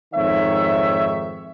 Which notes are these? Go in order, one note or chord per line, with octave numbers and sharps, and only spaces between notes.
F2 G#2 D#3 C#5 E5